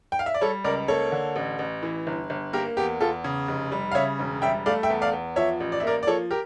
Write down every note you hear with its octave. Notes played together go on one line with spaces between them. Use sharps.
G5
F5
E5
D5
G3 A4 C#5
C#2 A#4 D5
A#3 A4 C#5
D3
A1
A1
E3
G1
G1
A#3 G4 A#4
E2 G4
E2 F4 A4
C#3
F1
G3
F5
C#3 C#5 E5
E1
G3 E5 G5
A3 D5 F5
E5 G5
E2
D5 F5
E2
F3 C#5 E5
A1
D5
E5
A#3 A#4 D5
D5
F3 A4 C#5
G4 A#4